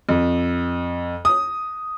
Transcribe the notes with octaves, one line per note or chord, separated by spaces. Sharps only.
F2
D#6